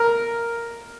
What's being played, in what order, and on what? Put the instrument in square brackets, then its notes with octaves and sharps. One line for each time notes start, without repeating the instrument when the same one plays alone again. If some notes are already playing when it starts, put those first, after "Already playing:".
Already playing: [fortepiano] A#4